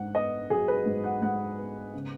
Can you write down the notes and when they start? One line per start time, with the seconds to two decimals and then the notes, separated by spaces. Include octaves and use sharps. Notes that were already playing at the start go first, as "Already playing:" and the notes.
Already playing: G#2 F#5
0.14 B3 D#5
0.50 F#3 G#4
0.68 B4
0.86 G#2
1.04 F#5
1.22 G#2 F#5
1.58 B3
1.94 C#3